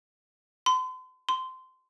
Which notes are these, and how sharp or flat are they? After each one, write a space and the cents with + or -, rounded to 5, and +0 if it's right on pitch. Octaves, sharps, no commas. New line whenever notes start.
C6 -40
C6 -20